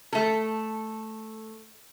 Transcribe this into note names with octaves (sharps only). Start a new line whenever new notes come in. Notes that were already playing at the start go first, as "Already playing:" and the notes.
A3 A4